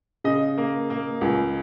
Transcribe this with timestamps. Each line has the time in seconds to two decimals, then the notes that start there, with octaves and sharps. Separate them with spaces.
0.24 C#3 D#5
0.58 A#3
0.90 A#3
1.21 C#2